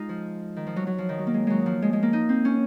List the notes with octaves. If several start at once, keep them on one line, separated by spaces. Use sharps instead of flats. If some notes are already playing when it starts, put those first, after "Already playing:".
Already playing: G#3 D#4 F4
F3
D#3
F3
F#3
F#3
F3
D#3
F#3
A#3
G#3
F#3 G#3
F3
G#3
G#3
A#3
D#4
C4
C#4